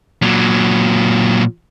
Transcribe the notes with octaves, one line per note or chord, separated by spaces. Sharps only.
A#2 F#3